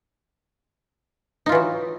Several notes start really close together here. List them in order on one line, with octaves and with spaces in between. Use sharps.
D#4 F4 E3 F#3